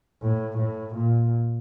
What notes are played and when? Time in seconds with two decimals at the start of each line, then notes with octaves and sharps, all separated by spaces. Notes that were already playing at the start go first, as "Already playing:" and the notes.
0.22 A2
0.57 A2
0.94 A#2